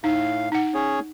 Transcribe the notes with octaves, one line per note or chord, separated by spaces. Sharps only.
A2 D#4 F5
D#4 F#5
C#4 G#4 C#5